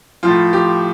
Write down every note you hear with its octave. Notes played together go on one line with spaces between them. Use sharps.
F3 F4
A2
G4